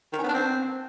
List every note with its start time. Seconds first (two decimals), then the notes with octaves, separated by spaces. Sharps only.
0.13 D#3
0.18 C#4
0.23 B3
0.28 D4
0.34 C4